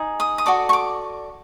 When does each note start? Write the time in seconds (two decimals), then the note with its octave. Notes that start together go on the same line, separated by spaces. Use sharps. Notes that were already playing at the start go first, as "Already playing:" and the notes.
Already playing: D#4 G#4
0.20 D#6
0.38 D#6
0.46 F#4 A4 D5 D6
0.69 C#6
0.73 D6